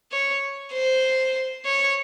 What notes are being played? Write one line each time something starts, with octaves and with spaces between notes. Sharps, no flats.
C#5
C5
C#5